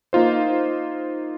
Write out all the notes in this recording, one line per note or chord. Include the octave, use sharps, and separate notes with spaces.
A#3 D#4 F4 C5